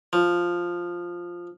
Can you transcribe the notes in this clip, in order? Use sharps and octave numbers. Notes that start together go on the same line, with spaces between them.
F3